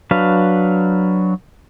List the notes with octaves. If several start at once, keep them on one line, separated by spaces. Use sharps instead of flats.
F#3 D4 B4 F5